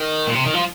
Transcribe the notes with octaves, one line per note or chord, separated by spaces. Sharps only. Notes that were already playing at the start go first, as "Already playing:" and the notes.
Already playing: D#3
A#2
C3
D#3
F3